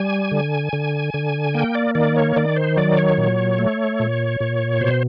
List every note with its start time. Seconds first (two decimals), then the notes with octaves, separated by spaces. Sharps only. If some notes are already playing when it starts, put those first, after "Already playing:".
Already playing: G3 G#5
0.31 D3
0.73 D3
1.14 D3
1.54 A#3 G5
1.75 D5
1.95 D#3 D5
2.16 C#5
2.36 D#3 D5
2.56 C5
2.77 F#3 D5
2.97 C#5
3.18 A#2
3.59 A3
4.00 A#2
4.40 A#2
4.81 B2 C5